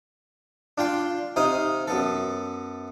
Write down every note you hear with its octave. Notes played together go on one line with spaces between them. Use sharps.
D4 F4 G5 C6
C3 D#4 C5 F5 D#6
F#2 B3 A4